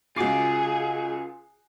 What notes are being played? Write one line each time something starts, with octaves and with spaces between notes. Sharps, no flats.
C#2 F4 F#4 G#4 D6 C7